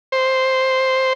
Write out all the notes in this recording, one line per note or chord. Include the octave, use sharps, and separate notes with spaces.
C5